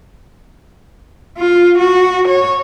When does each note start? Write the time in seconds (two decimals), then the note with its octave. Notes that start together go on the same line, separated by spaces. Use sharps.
1.38 F4
1.79 F#4
2.28 C#5